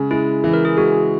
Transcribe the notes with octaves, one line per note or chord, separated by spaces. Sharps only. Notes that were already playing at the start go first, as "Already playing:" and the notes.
Already playing: C#3 G#3
G#3 E4
E3
A#4
G#4
G#3 F#4